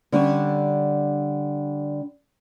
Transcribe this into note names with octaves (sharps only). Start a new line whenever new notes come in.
D3 G3 C#4 D4